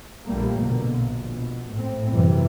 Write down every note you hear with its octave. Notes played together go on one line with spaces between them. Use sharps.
A#1 D3 G3 A3 A#3
B2 D3 A#3
A#1
B2
A2 C4
F#2 A2 C3 E3 G3